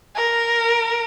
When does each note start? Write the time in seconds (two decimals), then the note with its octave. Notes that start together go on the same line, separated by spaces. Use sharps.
0.16 A#4